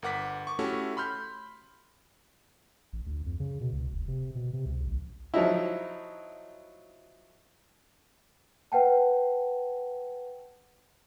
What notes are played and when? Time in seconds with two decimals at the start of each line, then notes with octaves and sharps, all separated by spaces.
0.02 G1 A#4 F#5 D6 B6
0.47 C#6 D6
0.59 A3 C#4 E4 F#4 G4 A4
0.97 B5 C6 F6 G6
2.93 A1
3.06 D2
3.26 F2
3.40 C#3
3.61 B2
3.72 C#2
3.93 F1
4.08 C3
4.35 B2
4.53 C3
4.66 C#2
4.86 A#1
5.34 F3 F#3 D#4 E4
8.72 B4 F#5 G5 A5